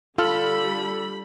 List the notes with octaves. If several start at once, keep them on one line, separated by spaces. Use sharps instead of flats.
D3 G3 F4 A4 B5 F6